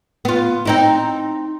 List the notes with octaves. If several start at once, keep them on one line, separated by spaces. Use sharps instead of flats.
B3 F4
C4 D#4 E4